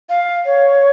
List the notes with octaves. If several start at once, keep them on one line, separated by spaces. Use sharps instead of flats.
F5
C#5